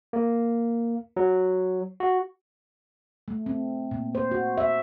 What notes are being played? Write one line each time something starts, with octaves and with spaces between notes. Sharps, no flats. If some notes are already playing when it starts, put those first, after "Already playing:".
A#3
F#3
F#4
A3
C4
A#2
C5
F#4
E5